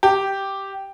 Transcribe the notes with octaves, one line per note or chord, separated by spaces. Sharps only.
G4